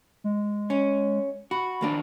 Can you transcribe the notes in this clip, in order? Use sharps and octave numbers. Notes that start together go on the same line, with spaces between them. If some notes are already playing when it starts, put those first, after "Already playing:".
G#3
C#4
F#4 B5
D#2 A#3 D4